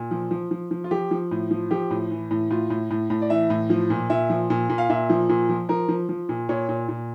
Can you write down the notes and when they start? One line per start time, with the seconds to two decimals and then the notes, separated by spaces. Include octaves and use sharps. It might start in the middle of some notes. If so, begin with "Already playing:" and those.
Already playing: A#2
0.11 F3
0.31 F3
0.51 F3
0.71 F3
0.84 F4
0.91 F3 G4
1.11 F3
1.31 A2
1.51 F3
1.71 F3 G4
1.91 A2
2.11 E3
2.31 A2
2.50 A2 F4
2.70 A2
2.90 A2
3.10 A2
3.22 D5
3.30 E3 E5
3.50 A2
3.70 F3
3.90 A#2
4.10 A#2 E5
4.30 F3
4.50 A#2
4.69 A#2
4.78 F5
4.90 A#2 E5
5.10 F3
5.29 A#2
5.49 F3
5.69 F3 A#4
5.89 F3
6.09 F3
6.29 A#2
6.49 A#2 C#5
6.69 A#2
6.89 A#2